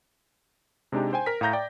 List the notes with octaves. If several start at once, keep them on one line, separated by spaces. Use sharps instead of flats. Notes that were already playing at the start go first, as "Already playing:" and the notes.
C3 G#3 D4 D#4 G4
C5 G5 G#5
A#4 B6
A2 F5 A#5 G6 A#6
D5 G5